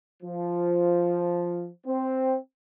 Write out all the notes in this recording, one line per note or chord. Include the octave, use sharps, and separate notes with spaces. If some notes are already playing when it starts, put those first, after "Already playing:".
F3
C4